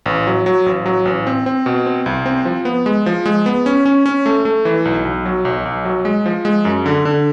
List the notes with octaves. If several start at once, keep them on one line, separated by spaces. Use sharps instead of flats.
A1
F#3
F#3
A1
F#3
A1
C4
C4
B2
C4
C2
C4
F3
B3
G#3
F3
G#3
B3
C#4
C#4
C#4
A3
A3
E3
B1
B1
F#3
B1
B1
F#3
G#3
F3
G#3
F#2
D3
D3